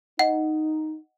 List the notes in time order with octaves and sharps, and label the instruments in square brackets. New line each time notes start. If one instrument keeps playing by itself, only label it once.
[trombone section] D#4 [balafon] D#5 [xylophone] F#5